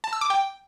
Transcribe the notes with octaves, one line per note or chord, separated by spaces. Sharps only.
A5
E6
D6
G5